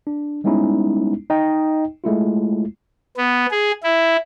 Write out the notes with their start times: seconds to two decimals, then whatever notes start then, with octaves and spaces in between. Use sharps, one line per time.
0.07 D4
0.44 G3 G#3 B3 C#4 D#4 E4
1.30 D#4 D#5 G5
2.04 G#3 A3 E4 F4
3.17 B3
3.51 G#4
3.83 E4